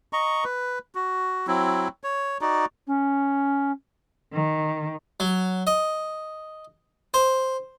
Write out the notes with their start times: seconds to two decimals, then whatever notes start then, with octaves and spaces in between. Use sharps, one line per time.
0.13 D#5 A#5 C#6
0.44 B4
0.95 F#4
1.47 F#3 C4 E4
2.04 C#5
2.41 D#4 F#4 D5
2.87 C#4
4.33 D#3
5.20 F#3
5.67 D#5
7.14 C5